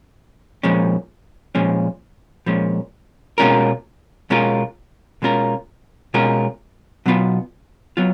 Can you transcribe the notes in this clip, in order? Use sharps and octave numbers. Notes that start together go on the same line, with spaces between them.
A#2 F3 G#3 C#4
A#2 F3 G#3 C#4
A#2 F3 G#3 C#4
B2 G#3 C#4 F4 A#4
B2 G#3 C#4 F4 A#4
B2 G#3 C#4 F4 A#4
B2 G#3 C#4 F4 A#4
B2 F#3 B3 F4
F#3 B3 F4